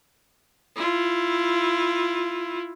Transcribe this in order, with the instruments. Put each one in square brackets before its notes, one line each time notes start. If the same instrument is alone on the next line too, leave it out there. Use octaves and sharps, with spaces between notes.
[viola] E4 F4